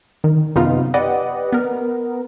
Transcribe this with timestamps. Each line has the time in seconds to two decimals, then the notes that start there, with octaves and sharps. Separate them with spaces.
0.24 D#3
0.55 F#2 C3 B3 D#4 F4
0.94 G4 B4 D5 D#5 F#5
1.52 B3 A#4